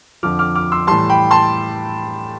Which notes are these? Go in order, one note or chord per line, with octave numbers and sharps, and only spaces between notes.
F2 D3 F3 D6 F6
D6 F6
D6 F6
C6 E6
A2 E3 G3 A5 C6
G5 B5
A5 C6